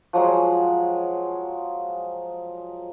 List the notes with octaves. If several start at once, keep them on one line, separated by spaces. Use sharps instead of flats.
F3 F#3 G#3